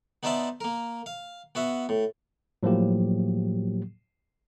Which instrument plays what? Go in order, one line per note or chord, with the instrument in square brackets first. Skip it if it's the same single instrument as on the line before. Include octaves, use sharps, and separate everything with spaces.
[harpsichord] B3 D#4 C5 D5 E5 A5
A#3 A#4
F5
B3 F#4 E5
A2
[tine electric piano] A2 F3 F#3 A#3 G4